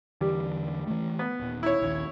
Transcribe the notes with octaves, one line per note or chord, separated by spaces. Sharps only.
E2 D3 E3 G3
E3 A3
B3
D#1 A#2
E4 C#5
A#1 D#2